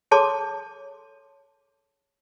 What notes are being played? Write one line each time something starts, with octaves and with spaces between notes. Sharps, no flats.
G#4 A4 C#5 A5 C6 D6